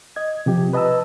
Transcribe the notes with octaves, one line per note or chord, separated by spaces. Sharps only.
D#5 G#6
C3 F3 G4
B4 D#5 A5 A#5 E6